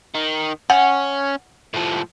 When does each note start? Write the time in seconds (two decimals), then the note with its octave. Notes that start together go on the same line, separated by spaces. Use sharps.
0.15 D#3
0.70 C#4 F#5
1.74 A2 F3